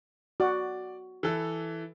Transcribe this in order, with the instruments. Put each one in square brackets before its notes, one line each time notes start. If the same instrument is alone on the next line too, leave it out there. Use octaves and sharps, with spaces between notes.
[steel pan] F#4 [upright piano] D5
[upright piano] E3 A4